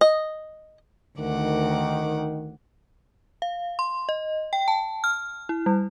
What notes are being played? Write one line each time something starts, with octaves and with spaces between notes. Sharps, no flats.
D#5
D2 D#3 F#5 D6
F5
C6
D#5
G5
A5
F6
E4
G3